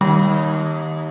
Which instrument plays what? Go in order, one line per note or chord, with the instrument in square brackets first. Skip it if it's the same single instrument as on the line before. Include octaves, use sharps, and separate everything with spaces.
[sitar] D#2 [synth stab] G3